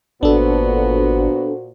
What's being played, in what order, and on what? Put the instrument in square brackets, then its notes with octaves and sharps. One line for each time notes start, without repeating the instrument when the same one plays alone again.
[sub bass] G#1 [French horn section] A#2 F#4 C5 [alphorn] B3 [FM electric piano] D4 A4